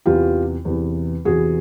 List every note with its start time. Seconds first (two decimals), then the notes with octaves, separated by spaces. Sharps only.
0.06 E2 C3 E3 F4 G4
0.65 E2 C3 E3
1.25 E2 C3 E3 F#4 G#4